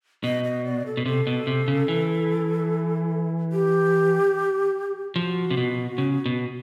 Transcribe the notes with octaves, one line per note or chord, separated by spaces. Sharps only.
B2 D#5
D#5
D5
A4
B2
C3 A4
B2
C3
C#3
E3
G4
F3 F#4
C3
B2
C#3
B2